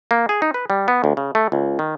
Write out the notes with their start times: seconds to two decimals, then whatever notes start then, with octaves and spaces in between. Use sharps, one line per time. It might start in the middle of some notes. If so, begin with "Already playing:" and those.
0.11 A#3
0.29 G#4
0.42 D#4
0.54 B4
0.70 G3
0.88 B3
1.04 D2
1.17 C#3
1.35 A3
1.52 C#2
1.79 D#3